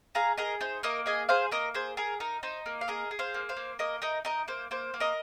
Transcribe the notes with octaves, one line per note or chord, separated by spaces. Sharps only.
G#4 F5 A#5
G#4 A#4 D#5
D#4 C5
A#3 A#4 D#5
G#4 D#5 G#5
G#4 C5 F5
A#3 A#4 D#5
G#4 C5
G#4 A#4
D#4 A#4
D#4 C5
A#3
F5
G#4 A#4 D#5
G#4
C5 F5
A#3
C5 F5
A#3
A#3 A#4 D#5
D#4 A#4 D#5
D#4 A#4 D#5
A#3 C5
A#3 C5
A#3
A#4 D#5